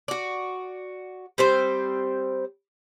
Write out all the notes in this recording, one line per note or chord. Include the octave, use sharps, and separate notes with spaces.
F#4 D5
G3 C4 C5